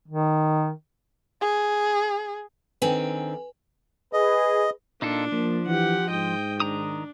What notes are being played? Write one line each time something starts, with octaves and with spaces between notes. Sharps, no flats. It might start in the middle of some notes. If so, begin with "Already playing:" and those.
D#3
G#4
D3 D#3 C4 B4 G#5
G#4 B4 D#5
A#2 D4 D#4 F4 A4
F3 A#3
E3 G4 F#5
G#2 D#5 G5
D#3 D4 A#5 D#6